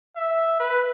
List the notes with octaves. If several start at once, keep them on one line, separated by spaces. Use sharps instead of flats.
E5
B4